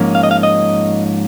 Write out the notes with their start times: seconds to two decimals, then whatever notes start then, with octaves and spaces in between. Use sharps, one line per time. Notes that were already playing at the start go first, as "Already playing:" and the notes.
Already playing: G#2 F3 A#3 C#4
0.15 F5
0.23 D#5
0.31 F5
0.43 D#5